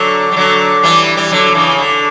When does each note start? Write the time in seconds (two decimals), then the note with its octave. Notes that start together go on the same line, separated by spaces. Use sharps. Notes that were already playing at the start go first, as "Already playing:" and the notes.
Already playing: D3 F#3
0.31 G3
0.36 D3 F#3
0.83 E3 G3
1.17 G3
1.31 D3 F#3
1.55 C#3 E3
1.78 D3